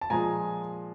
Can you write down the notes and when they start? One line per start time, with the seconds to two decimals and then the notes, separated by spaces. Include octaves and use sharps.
0.01 A5
0.10 A#2 F3 G#3 G#5 A#5